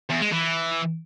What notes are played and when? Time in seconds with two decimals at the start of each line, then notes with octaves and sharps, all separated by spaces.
0.10 E2
0.21 G#3
0.32 E3